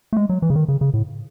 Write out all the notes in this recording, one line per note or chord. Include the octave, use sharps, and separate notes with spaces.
A3
G#3
F#3
E3
C#3
D#3
C#3
C#3
A2